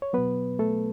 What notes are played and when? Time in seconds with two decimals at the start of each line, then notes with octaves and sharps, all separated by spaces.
0.02 C#5
0.13 B2 F#3 B3 B4
0.59 A3 A4